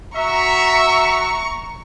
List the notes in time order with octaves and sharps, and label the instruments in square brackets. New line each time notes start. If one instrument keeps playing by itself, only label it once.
[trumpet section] F#4 E5 [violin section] A#5 C#6